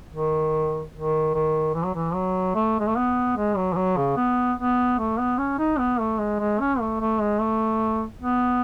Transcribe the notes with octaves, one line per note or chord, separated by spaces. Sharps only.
D#3
D#3
D#3
E3
F#3
E3
F#3
A3
G#3
A3
B3
G#3
F#3
E3
F#3
C#3
B3
B3
A3
B3
C#4
D#4
B3
A3
G#3
G#3
C#4
A3
A3
G#3
A3
B3